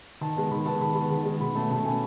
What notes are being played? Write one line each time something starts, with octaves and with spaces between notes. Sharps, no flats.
D#3 A5
G#3 B3
D#3 B5
G#3 B3 A5
D#3 B5
G#3 B3 A5
D#3
G#3 B3
B2 B5
A3 C#4 A5
B2 A5
A3 C#4 G#5